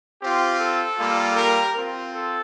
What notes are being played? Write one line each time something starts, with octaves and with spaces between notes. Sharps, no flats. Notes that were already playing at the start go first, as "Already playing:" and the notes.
C4 F4 G4
A4
G3 A#3 F4
G4 A#4
C4 F4
A4